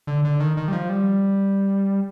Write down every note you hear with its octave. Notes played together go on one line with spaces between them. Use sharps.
D3
D3
D#3
D#3
G3
F3
G3